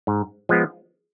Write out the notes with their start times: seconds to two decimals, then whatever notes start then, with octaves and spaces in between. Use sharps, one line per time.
0.07 G#2
0.49 F3 G#3 B3